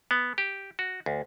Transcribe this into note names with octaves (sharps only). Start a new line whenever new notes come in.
B3
G4
F#4
D2